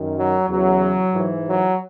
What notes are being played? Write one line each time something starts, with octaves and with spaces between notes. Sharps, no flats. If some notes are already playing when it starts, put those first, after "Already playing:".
Already playing: F#2 D#3
F#3
E2 C#3 E3 F#3
G#2 E3
F#3